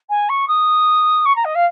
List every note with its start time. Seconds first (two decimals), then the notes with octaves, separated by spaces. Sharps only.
0.09 G#5
0.29 C#6
0.48 D#6
1.25 C#6
1.36 A#5
1.44 D#5
1.55 F5